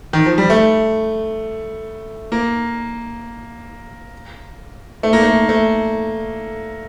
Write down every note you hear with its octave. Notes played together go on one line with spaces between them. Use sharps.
D#3
F3
G3
A3
A#3
A3
A#3
A3
A3